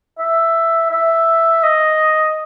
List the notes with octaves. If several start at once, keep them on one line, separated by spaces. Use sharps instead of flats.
E5
E5
D#5